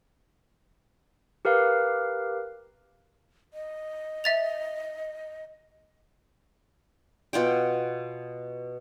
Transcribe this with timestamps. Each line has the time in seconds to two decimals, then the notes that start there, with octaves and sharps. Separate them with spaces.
1.45 G4 A#4 B4 F5
3.54 D#5
4.24 E5 A6 F7
7.33 B2 F4 F#5 G5